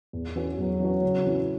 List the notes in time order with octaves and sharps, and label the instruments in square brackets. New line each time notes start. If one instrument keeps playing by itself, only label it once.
[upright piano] E2
E3 C#4 F#4 C#5
[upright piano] E2 [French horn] F#3
[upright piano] E3 C#4 F#4 C#5
C#3
E3 C#4 E4